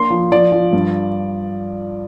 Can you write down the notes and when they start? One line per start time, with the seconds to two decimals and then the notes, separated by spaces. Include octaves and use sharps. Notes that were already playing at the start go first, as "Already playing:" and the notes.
Already playing: A#3 D4 C6
0.10 F3
0.32 F3 D5
0.52 F3
0.73 G2